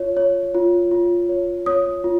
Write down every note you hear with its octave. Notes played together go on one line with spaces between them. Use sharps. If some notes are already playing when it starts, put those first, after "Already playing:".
Already playing: F4 C#5
C#5
F4
F4
C#5
C#5 D#6
F4